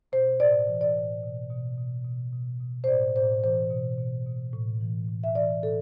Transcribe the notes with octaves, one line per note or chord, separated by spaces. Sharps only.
B2 C5
A2 D5
E3
D5
A2
B2
B2
B2
B2
B2
B2
C5
A2 D5
A2 C5
E3 C5
B2
B2
B2
A2
E3
A2
E5
E3 D5
A2 A4